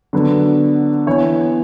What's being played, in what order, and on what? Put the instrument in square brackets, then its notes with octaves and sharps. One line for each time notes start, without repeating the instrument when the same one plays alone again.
[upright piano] D3 F#3 B3
E3 B3 C#5